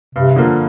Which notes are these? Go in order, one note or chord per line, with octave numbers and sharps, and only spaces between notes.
G2 C3
D3 F3 A#3